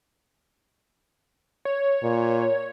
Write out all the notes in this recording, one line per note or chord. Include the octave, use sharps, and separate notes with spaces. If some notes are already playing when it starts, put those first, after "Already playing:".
C#5
A#2